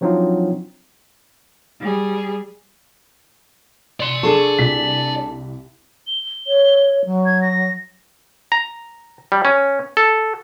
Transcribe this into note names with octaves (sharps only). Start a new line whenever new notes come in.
F3 F#3 C4 D4 D#4 F4
G3 G#4
D5 C6
D4 G#4 A4 C#6
C2 B6
G7
C#5
F#3
G#6
A#6
A#5
G3
C#4
A4